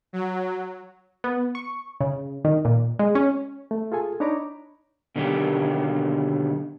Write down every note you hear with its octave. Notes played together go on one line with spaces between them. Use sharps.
F#3
B3
C#6
C#3
D#3
A#2
G#3
C#4
A3
F4 G#4 A4 G#5
D4 D#4 C#5 A#5 B5 D6
B2 D3 D#3 F#3 C#4 G4